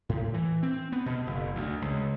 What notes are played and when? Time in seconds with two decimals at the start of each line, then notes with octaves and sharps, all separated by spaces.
0.09 A2
0.34 E3
0.63 C4
0.92 B3
1.06 B2
1.27 F#1
1.55 D2
1.82 C#2